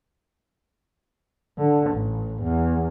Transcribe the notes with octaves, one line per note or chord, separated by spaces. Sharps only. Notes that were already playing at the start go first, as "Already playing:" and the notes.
D3
A1
E2